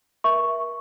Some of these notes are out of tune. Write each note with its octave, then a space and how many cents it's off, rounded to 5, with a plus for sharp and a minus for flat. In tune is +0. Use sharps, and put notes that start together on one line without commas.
A#4 +35 E5 +0 C#6 +0